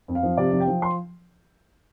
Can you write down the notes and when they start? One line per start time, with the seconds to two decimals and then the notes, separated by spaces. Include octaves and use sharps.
0.08 F2
0.15 F5
0.23 F3
0.37 C3 D5
0.52 F3
0.60 G5
0.67 F3
0.82 C6